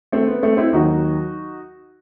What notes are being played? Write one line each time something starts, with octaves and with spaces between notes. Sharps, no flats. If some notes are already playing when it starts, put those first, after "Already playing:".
A3 C4
B3
A3 C4
C4 E4
D#2 D#3 F#3 D#4 F#4